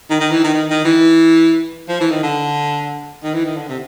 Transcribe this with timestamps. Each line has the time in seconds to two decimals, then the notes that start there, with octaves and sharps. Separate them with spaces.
0.10 D#3
0.21 D#3
0.32 E3
0.44 D#3
0.54 D#3
0.70 D#3
0.85 E3
1.89 F3
2.01 E3
2.11 D#3
2.23 D3
3.24 D#3
3.34 E3
3.46 D#3
3.57 D3
3.69 C3